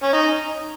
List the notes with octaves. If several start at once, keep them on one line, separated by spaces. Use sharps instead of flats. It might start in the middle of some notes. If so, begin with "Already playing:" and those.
C#4
D#4